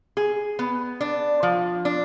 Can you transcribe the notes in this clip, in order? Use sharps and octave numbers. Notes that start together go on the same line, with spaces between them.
G#4
B3
D4
F3
D4